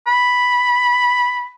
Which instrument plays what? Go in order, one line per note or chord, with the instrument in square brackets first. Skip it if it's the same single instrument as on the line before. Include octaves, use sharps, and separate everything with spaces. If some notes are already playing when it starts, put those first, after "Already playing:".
[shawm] B5